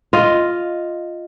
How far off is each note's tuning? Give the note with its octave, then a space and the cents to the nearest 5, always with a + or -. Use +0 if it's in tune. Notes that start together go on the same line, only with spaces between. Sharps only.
F4 +0 D#5 +0